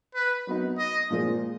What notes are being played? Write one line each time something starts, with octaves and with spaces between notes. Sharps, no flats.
B4
F#3 B3 D#4
D#5
A#2 F3 G#3